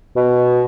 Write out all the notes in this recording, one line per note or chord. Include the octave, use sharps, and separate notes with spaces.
B2